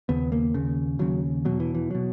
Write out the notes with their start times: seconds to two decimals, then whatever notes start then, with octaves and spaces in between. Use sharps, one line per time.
0.09 D#2 C#3 B3
0.32 A#3
0.54 D#2 C#3
0.99 D#2 C#3 F#3
1.45 E2 B2 F#3
1.60 E3
1.75 E3
1.91 B2 F#3